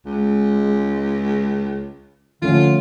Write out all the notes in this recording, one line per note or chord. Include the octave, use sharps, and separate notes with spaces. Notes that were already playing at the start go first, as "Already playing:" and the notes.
C#2 G#3
D3 F3 A3 C#4 F4